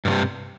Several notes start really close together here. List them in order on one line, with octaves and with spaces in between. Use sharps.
G2 D#3 C3